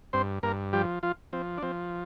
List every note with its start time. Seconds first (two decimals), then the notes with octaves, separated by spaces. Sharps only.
0.13 G2 C4 C5
0.43 G2 A#3 A#4
0.73 F3 G3 G4
1.03 F3 F4
1.33 F3 C4
1.58 D4
1.63 F3 C4